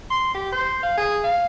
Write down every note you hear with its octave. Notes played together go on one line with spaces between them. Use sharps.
C6
G4
C5
F5
G#4
F5